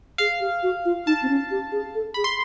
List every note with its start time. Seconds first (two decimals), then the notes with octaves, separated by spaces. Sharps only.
0.18 G#4 F5
0.40 G4
0.63 F#4
0.85 F4
1.07 D#4 A5
1.23 C4
1.29 C#4
1.51 G4
1.72 G#4
1.95 A4
2.14 G#4 B5
2.24 C6